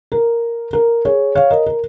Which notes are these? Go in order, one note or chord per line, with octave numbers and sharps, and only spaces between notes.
A#4
A#4
G#4 C#5
C#5 F5
A#4 D#5
A#4